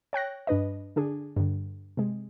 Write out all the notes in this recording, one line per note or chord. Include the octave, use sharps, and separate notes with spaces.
C#5 G5 F#6 A#6
G2 D4 B4 D#5
D3 D4 G#4
G2 D3
C3 G#3